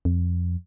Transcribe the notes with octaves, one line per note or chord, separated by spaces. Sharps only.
F2